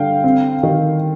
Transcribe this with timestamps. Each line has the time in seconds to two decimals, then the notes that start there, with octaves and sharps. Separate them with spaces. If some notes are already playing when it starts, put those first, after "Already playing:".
Already playing: G2 D3 F5 G5
0.24 C4
0.63 D#3